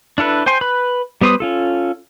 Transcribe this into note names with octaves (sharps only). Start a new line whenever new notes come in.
D4 E4 A4 B4
C5 G5 G#5 C6
B4 B5 F#6
G3 B3 B4 C5 D#6
C#4 F4 A4